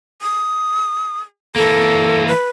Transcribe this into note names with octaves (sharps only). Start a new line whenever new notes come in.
D#6
E3 A#3 A4
B4